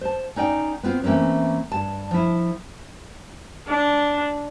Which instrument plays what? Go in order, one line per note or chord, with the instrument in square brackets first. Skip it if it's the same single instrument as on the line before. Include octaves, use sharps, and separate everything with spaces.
[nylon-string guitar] C5 A5
C#4 D#4 D5 G5
B3 C4 F4
E3 A3 A#3 C4 C#4
G2 A5
F3 E4
[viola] D4